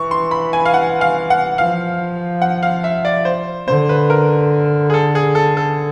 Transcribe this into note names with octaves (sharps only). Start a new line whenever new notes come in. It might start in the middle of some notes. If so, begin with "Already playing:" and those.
Already playing: E3 C#6
C6
B5
G#5
F5
F#5
F5
F#5
F3 F5
F#5
F5
E5
D5
C5
D3 C5
B4
A#4
G#4
A4
G#4
A4
A4